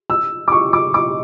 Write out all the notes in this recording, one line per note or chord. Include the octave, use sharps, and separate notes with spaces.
E6
D6
C#6
D6
D6